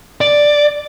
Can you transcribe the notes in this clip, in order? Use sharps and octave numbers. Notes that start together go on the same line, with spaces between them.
D5